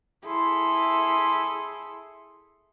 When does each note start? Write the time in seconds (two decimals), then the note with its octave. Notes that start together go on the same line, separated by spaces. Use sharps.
0.25 E4 G#4 A4 C6